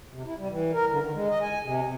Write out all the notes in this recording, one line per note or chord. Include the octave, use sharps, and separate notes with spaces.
C3
E4
G3
E3
A#4
D3
D#3
G#3
D#5
G#5
C3
C3